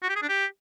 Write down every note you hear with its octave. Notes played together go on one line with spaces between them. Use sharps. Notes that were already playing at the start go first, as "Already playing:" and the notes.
F#4
G4
G#4
D4
G4